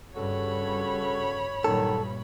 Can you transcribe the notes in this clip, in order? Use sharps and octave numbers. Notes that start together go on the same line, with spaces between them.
G2 C#3 F#4 A4 C#5 B5
G2 A#2 D#3 F#3 A4